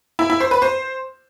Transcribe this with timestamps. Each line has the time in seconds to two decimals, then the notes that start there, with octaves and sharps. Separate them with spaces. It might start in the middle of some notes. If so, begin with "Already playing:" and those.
0.19 E4
0.30 E4
0.40 C5
0.51 B4
0.62 C5